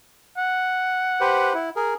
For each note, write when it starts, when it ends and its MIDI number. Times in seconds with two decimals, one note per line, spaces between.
0.37 1.73 78
1.21 1.53 67
1.21 1.53 71
1.21 1.53 72
1.54 1.70 64
1.76 1.94 68
1.76 1.94 70